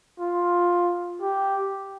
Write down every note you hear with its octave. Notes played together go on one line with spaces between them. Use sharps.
F4
G4